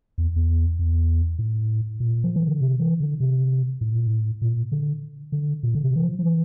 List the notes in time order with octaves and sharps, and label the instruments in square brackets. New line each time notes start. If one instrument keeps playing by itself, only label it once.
[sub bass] E2
E2
E2
A2
A#2
F3
E3
D3
C3
E3
D3
C3
A2
A#2
A2
A#2
D3
D3
A#2
D3
C3
E3
F3
F3
E3